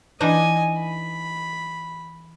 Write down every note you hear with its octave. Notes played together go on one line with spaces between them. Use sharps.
E3 D4 D#4 D#5 G#5
B5